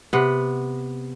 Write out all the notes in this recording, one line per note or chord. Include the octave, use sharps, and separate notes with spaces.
C3 B3